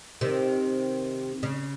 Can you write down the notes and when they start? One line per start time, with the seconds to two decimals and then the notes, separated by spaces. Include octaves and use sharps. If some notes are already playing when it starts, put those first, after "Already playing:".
0.21 C3 D#3
1.43 C#3